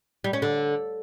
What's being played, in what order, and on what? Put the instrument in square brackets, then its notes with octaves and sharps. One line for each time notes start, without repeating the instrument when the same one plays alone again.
[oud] G3
C#4
D3